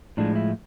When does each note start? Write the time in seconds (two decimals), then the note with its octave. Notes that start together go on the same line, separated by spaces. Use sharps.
0.17 A2 F3 G#3 D4
0.35 E4